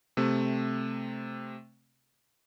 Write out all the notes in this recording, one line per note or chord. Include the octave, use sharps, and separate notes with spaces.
C3 A3 C4